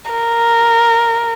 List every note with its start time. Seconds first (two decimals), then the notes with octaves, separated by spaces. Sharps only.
0.11 A#4